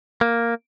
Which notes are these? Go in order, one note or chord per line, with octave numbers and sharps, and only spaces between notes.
A#3